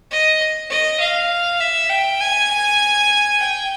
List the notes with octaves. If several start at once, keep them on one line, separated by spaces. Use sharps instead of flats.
D#5
D#5
F5
E5
G5
G#5
G5